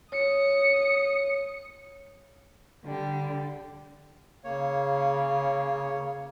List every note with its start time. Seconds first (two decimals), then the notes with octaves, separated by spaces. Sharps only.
0.12 C#5 D#6 C#7
2.85 D3 G3
4.44 C#3 A#3 C#5